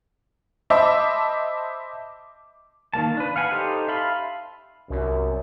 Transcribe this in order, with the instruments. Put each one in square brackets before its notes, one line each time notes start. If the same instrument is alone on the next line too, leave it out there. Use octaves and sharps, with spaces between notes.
[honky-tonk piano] C5 D#5 E5 A5 B5 D6
[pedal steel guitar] D#3 G3 A#3 A5
D4 B4
F5 F#5 G#5 B5
D#4 G4 A4 C5
E5 F5 A5 B5 C6
[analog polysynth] C2 [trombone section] F#2